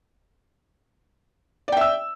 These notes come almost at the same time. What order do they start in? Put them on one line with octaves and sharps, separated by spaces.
D5 G5 E5 E6